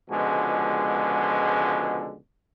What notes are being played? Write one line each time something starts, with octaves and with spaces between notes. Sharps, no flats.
C#2 B2 D3 F3 G#3